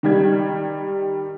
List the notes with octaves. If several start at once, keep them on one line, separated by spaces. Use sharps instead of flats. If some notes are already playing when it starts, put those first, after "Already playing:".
D#3 G3 G#6